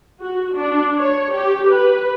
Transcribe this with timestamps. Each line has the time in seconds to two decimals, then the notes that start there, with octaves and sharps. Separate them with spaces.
0.22 F#4
0.56 D4
0.97 C#5
1.33 G4
1.69 B4